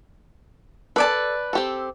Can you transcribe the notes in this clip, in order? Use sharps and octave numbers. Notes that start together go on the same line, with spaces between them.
A4 B4 D5 A5
C4 G4 A4